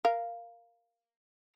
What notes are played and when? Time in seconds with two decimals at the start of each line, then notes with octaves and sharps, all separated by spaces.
0.05 A#4 F5